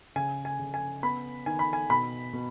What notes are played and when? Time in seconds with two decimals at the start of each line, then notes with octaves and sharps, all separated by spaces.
0.16 C#3 G#5
0.45 G#5
0.59 C#3
0.74 G#5
1.03 B3 B5
1.46 D#3 G#5
1.59 B5
1.73 G#5
1.90 B2 B5
2.33 B2